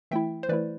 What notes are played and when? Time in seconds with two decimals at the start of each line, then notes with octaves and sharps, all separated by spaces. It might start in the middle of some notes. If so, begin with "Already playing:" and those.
0.11 E3 A3 E4 E5 G5
0.43 C5
0.49 E3 A3 E4 B4 D5